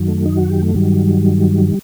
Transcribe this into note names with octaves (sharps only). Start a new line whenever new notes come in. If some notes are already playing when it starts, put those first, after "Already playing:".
Already playing: F#2 D#3 F#3
A3
D#4
F#4
G4
A3
G2 D#3 F#3 G3